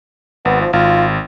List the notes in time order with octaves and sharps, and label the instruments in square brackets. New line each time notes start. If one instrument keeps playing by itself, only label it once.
[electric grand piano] G#1 [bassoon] B3
[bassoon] F3
[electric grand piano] G#1 [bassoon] F4